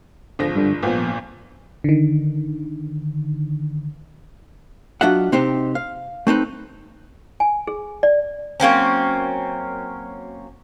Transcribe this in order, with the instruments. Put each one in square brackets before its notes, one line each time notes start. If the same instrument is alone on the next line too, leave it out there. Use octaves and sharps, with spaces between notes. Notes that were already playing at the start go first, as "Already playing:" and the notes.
[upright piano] G#1 F3 A#6 [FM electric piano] D3
[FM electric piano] G2 D3
[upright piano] G#1 A#2 [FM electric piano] F3 B3
[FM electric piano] D3 D#3
[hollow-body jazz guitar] F#3 D4 F4 D#5 E5 F#5
C3 C4 D#4 G4 C5
F5
A3 C4 D#4 B4
[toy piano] G#5
G#4
D5
[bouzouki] F#3 A#3 C4 C#4